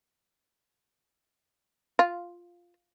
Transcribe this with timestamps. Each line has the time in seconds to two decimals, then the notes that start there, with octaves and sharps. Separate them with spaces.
1.99 F4